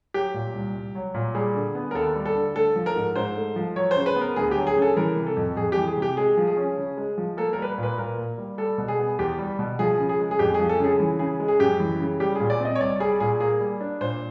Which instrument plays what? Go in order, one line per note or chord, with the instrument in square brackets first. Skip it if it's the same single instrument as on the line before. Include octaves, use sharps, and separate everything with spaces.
[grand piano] F#3 G4
A#2
C2
C2
F#3
A#2
G3 G#4
D3
B3
A#4
D#2 A4
G3
A4
D3
A3 A4
F3
A#4
G#2
G#2 C5
A3
F3
F#3 C#5
C5
C#3
B4
B3 A#4
D2 G#4
G4
F#3
G#4
C#3
A4
E3 A#4
C3
A4
F2
F2 G#4
E3 G4
G#4
C3
G4
G#3 G#4
F3
G#4
C#4
C#3
G#3
F3
A#3 A4
A#4
G3 B4
A#4
A#2
B4
A#2 A#4
A#3
G3
G3 A4
B2
G#4
B3
E2 G4
G3
B2
F3 G#4
C#3
G#4
G#3
G#4
F2 G4
F3 G#4
A4
C#3 G#4
E3
C#3 G#4
G#3
G#4
F#2 G4
E3
C#3
G3 G4
A#2 G#4
D5
C4 D#5
C#5
C2 D5
G3 G#4
A#2 G#4
A#3 G#4
G3
D4
A#2 C5